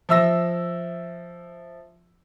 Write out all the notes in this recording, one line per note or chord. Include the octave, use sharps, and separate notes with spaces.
F3 E5 E6 A#6